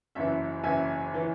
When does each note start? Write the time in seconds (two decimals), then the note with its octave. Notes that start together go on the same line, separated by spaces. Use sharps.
0.15 F#1 F#2 E3 E5
0.63 F#1 F#2 E3 E5 G#5
1.14 E3